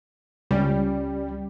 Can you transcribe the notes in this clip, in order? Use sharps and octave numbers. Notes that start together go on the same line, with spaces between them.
C#2 G3 C#4